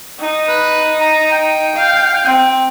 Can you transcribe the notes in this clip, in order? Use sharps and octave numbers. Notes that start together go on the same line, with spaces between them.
D#4
B4
A#5
G5
F5
C4